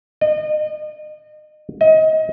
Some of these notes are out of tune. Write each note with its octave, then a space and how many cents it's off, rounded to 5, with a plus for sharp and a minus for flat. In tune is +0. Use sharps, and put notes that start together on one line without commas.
D#5 -35
D#5 +25